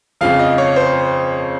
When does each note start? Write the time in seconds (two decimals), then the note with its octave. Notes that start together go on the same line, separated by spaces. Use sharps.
0.21 F2 C#3 F3 F5
0.39 D#5
0.58 C#5
0.76 C5